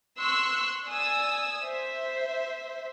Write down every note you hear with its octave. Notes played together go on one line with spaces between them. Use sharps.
C6 C#6 E6 F#6
D5 G#5 D#6 E6
C5 E5